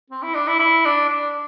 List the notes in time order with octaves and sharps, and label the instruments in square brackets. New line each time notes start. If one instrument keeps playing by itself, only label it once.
[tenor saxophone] C4
E4
D4
E4
E4
D4
D4